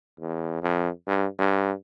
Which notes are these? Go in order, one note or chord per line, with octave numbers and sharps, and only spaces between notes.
E2
F2
G2
G2